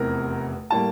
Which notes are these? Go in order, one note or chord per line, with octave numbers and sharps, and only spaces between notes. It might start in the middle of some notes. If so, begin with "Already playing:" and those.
Already playing: F1 E2 C3 A#4
A2 G3 A#3 A5